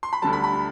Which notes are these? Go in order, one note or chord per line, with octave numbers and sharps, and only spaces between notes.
C6
B5
D2 D3 G3 A5
B5
B5